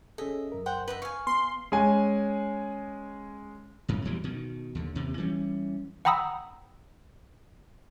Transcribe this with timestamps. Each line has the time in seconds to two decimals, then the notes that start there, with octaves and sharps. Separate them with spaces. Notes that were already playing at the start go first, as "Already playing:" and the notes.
0.18 C#4 G#4 A4 D#5 E5
0.52 F#2 A#4
0.66 C5 F#5 G5
0.88 B4 D#5 E5
1.02 F5 G#5 C#6
1.27 B3 C6
1.72 G#3 C#4 G#5
3.88 F#2 A2
4.05 E2 B2 E3 G3
4.24 B2 D#3
4.75 D#2 D3
4.95 D#2 C3
5.18 E3 G3 G#3 C#4
6.05 F#5 G5 A#5 B5 D#6 E6